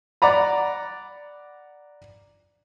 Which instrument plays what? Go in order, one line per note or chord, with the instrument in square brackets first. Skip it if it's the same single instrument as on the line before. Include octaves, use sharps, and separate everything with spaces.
[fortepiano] D5 F#5 A#5 B5